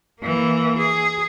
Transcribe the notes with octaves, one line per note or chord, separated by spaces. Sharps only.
E3 A#3
G#4